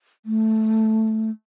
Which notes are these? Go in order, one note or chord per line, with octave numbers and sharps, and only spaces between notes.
A3